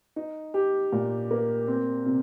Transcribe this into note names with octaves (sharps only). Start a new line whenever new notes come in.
D#4
G4
A#2
A#3
C4
C3